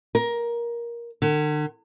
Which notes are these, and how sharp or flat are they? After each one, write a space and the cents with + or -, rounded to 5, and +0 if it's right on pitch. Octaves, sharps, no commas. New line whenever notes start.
A#4 +15
D3 +45